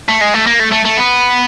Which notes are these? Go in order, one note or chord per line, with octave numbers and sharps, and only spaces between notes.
A3
G#3
A3
A#3
A3
A3
A3
B3